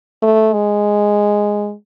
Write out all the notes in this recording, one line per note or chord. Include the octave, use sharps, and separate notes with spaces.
A3
G#3